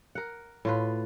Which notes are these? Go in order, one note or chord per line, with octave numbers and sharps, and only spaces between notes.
A#4 F#5
A2 F4 B4